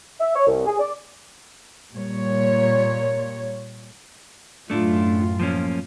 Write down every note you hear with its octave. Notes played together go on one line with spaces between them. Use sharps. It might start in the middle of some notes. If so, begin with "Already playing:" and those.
E5
C#5
C2
G#4
D5
A#2 G3 C#5
F#2 A2 A3 D4 E4 F4
F3 A#3 C#4